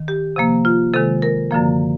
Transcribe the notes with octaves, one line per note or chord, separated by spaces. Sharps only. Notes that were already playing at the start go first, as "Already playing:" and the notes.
Already playing: D#3
G4
C3 F3 A#3
F4
C3 D#3 G#3 A4
A#4
F#2 D3 F3 A#3